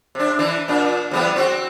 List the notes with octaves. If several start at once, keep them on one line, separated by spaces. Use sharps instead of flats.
C3 D4
E3 D4
A#2 D4
E2 G3 B3
C4 F#4